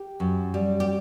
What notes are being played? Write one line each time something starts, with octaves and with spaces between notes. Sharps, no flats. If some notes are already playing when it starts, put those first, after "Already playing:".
Already playing: G4
F#2
G3
G4